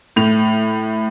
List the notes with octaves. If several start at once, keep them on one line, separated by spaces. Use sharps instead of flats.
A2 F7